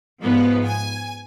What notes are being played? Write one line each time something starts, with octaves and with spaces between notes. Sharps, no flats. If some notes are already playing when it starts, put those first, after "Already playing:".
G#2 F3 B3
G#5